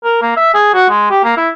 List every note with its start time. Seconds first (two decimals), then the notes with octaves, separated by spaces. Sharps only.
0.04 A#4
0.22 A#3
0.37 E5
0.54 G#4
0.74 F#4
0.90 G#3
1.10 G4
1.24 A#3
1.37 E4